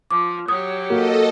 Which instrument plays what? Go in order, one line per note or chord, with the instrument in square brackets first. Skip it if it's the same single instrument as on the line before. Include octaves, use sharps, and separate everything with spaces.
[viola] F3 [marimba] D6
[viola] F#3 G4 [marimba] D#6
[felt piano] A#3 F#4 [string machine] A4 D#5